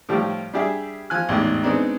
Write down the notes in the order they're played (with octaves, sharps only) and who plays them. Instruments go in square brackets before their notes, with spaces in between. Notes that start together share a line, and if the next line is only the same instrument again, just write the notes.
[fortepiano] A2 F3 G3 G4
G3 D4 G4 G#4 E5
F3 G#5 F#6
A1 E2 G#2
G#3 B3 C4 D4 D#4